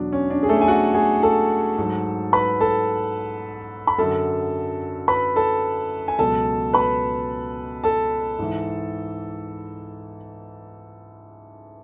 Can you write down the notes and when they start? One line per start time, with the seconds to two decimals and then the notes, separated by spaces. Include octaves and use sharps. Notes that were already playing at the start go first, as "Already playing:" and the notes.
Already playing: E2 B2 F#3 D4
0.13 C#4
0.30 D4
0.43 G#4
0.49 A3 A4
0.61 G#5
0.68 F#4 F#5
0.94 G#4 G#5
1.23 A4 A5
1.78 G#2 F#3
2.33 B4 B5
2.61 A4 A5
3.87 B5
3.98 F#2 D3 F#3 A4 A5
5.08 B4 B5
5.36 A4 A5
6.08 G#5
6.19 C#2 B2 F#3 A4 A5
6.73 B4 B5
7.84 A4 A5
8.39 G#2 E3